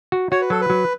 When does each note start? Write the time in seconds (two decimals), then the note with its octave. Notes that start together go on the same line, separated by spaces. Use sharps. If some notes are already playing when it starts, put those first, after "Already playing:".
0.12 F#4
0.31 F#4 C#5
0.41 B4
0.50 F#3 A4
0.61 B4
0.70 F#3